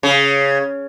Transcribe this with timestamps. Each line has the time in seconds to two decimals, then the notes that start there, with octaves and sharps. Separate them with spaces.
0.03 C#3